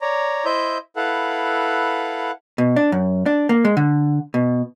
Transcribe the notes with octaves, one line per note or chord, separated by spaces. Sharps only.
C#5 D5 A#5
E4 C5 D#5 E5 G6
E4 A4 B4 F5 F#5
B2
D4
F#2
D4
A#3
G#3
D3
B2